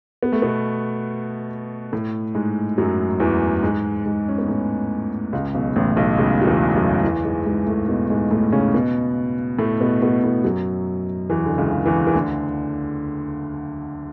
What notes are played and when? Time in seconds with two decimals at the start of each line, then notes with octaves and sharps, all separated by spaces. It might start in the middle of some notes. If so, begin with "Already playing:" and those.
0.23 B3
0.32 A3
0.42 B2 B3
1.92 A2 A3
2.35 G#2 G#3
2.78 F#2 F#3
3.20 E2 E3
3.63 G#2 G#3
4.06 G#2 G#3
4.29 C#4
4.38 B3
4.48 A2 A3
5.33 C#2 C#3
5.54 B1 B2
5.76 A1 A2
5.97 B1 B2
6.18 C#2 C#3
6.41 F#3
6.47 E2 E3
6.75 F#2 F#3
7.04 E2 E3
7.24 G#2 G#3
7.46 G#2 G#3
7.67 A2 A3
7.88 B2 B3
8.10 G#2 G#3
8.31 A2 A3
8.52 C#3 C#4
8.74 B2 B3
9.59 A2 A3
9.81 B2 B3
10.02 B2 B3
10.24 A2 A3
10.44 F#2 F#3
11.30 E2 E3
11.46 D3
11.58 C#2 C#3
11.86 E2 E3
12.07 E3
12.14 D2 D3